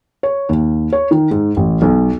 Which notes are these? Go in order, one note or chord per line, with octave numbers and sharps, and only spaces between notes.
C#5
D#2
C#5
D#3
G#2
A1
B1